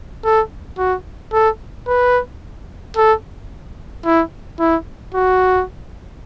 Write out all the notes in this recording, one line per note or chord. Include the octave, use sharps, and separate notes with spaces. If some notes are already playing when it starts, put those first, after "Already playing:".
A4
F#4
A4
B4
A4
E4
E4
F#4